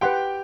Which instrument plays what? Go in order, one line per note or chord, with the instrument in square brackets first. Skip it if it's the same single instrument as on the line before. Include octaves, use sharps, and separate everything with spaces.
[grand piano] G4 G5 [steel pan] B4 F#5 C6